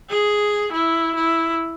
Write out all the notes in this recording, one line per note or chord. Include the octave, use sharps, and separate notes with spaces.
G#4
E4
E4